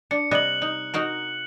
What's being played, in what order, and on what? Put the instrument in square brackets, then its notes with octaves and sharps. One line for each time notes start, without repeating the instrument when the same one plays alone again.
[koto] D4 [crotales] C#7
[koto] C3 G3 D#5 [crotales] F#6 F#7
[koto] D#4
D#4 F#4 A#4